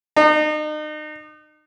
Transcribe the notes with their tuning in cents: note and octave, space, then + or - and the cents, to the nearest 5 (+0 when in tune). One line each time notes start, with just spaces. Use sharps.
D#4 -35